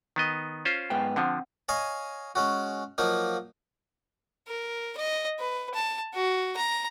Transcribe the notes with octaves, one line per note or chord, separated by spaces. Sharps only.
D#3 B3 D#5
C#4 F4 C5
G#2 B3 G5
D3 F3 C4 F#5
C#5 D#5 F5 G#5
G#3 C#4 F#4
F3 F#3 A#3 D#4
A#4
D#5
B4
A5
F#4
A#5